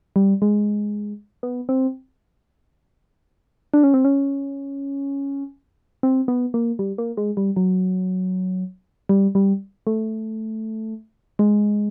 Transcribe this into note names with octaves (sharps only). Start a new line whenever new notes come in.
G3
G#3
B3
C4
D4
C#4
C4
C#4
C4
B3
A#3
G3
A#3
G#3
G3
F#3
G3
G3
A3
G#3